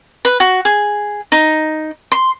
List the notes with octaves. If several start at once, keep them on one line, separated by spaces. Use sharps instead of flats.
B4
F#4
G#4
D#4
C6